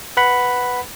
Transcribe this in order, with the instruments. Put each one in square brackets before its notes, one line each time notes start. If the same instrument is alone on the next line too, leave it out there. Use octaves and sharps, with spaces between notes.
[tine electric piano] B4 F#5 B5